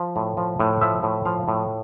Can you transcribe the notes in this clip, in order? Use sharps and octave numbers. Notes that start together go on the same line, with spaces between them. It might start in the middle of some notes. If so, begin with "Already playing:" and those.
Already playing: F3
A2
F3
A2
F3 E5
A2
F3 F5
A2